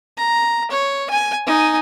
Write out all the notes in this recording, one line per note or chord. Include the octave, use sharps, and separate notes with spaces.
A#5
C#5
G#5
D#4 G#5